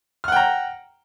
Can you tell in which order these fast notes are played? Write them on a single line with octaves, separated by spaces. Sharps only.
F6 F#5 G5 A#5